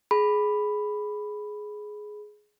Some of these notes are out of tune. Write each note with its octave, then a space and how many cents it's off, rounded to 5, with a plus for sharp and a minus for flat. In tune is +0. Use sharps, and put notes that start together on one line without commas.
G#4 +15 B5 +0